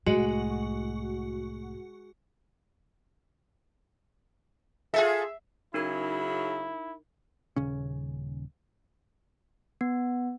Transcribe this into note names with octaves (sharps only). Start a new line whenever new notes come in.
C2 A2 G#3 F#4
F4 G#4 A4 E5
C#3 F#3 D#4 E4 A#4 G#6
D#1 C#3 C#4
B3